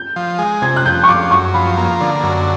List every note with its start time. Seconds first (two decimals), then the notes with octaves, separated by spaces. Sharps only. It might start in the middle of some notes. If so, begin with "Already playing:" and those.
Already playing: G6
0.16 F3
0.39 G#3
0.62 C3 G#6
0.76 F#6
0.85 F2 G6
1.03 C#6
1.08 F3 D6
1.31 F#2 C#6
1.54 F3 B5
1.77 A#3
2.00 D3
2.23 F#2